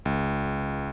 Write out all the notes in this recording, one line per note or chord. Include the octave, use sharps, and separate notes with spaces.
C#2